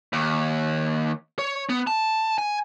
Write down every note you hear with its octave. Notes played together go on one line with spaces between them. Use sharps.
D#2
C#5
B3
A5
G#5